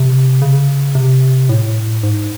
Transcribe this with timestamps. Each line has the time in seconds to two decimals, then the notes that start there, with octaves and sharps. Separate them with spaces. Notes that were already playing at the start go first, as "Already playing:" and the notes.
Already playing: C3
0.42 C#3
0.95 C3
1.49 A2
2.03 G#2